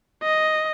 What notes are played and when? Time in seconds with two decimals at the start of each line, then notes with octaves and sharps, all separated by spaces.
0.23 D#5